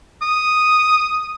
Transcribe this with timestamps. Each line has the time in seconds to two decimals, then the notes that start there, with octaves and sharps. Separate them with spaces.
0.22 D#6